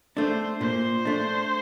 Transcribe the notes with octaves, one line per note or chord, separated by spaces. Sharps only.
A3 D4 C5
A#2 C5
A3 D4